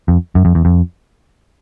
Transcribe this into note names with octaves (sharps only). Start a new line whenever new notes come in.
F2
F#2
F2
E2
F2